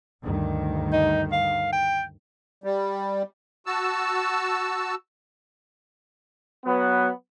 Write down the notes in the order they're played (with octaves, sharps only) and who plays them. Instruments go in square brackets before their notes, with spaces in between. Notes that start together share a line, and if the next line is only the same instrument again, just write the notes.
[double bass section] D2 G2 D#3
[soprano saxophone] D#4
F5
G5
[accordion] G3
F#4 A5 E6
[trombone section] F#3 B3